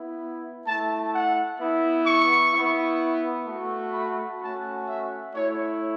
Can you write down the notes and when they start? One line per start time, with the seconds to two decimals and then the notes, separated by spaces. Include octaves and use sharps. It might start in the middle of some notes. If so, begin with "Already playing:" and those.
Already playing: B3 E4
0.65 A3 E4 A5
1.11 F#5
1.59 B3 E4
2.05 C#6
2.53 B3 E4
3.46 A3 F#4
3.93 B5
4.41 A3 C#4 F#4 A5
4.87 E5
5.34 A3 E4 C#5